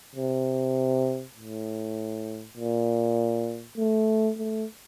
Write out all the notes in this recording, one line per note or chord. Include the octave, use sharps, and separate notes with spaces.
C3
A2
A#2
A3
A3